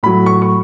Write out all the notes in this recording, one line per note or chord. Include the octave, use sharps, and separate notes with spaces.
A2 F#3 B5
C#6
C#6